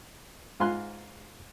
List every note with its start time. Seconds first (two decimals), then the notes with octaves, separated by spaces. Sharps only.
0.60 G#2 F4 G#5 C6 F#6